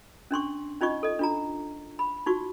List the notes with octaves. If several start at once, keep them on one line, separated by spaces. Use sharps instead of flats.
C#4 D4 C6 C#6
C#4 D#4 F4 D#5 C#6
A4 D#5
D4 F4 A#5
B5
D#4 F4 F#4 C#6